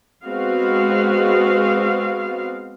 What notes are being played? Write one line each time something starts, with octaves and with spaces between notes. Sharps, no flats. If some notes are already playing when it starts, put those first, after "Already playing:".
G#3 B3 C4 F#4 F5